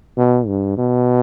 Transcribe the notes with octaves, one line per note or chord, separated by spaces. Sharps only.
B2
G2
B2